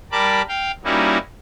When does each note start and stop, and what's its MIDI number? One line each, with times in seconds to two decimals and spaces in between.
0.12 0.42 55
0.12 0.42 70
0.12 0.42 81
0.12 0.42 83
0.12 0.42 86
0.48 0.71 77
0.48 0.71 79
0.84 1.18 55
0.84 1.18 58
0.84 1.18 61
0.84 1.18 63
0.84 1.18 64
0.84 1.18 66